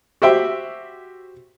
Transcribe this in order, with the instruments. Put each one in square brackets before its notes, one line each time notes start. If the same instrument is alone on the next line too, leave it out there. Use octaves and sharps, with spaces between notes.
[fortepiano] F#4 G4 C5 E5 G5